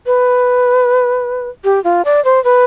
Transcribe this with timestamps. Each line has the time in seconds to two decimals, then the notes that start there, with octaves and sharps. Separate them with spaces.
0.06 B4
1.64 G4
1.84 F4
2.05 D5
2.25 C5
2.44 B4